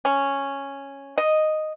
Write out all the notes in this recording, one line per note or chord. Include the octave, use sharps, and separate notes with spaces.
C#4
D#5